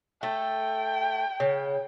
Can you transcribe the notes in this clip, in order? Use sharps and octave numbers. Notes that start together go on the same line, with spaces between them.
A3 A4 G5
C#3